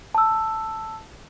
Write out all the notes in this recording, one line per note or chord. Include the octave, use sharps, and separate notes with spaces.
A5 E6